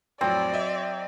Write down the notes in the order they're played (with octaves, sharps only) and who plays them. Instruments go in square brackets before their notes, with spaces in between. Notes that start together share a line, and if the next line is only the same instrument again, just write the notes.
[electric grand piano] F2 A2 F#3 [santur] C4 [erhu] D5
[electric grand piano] F#3 D#5 E5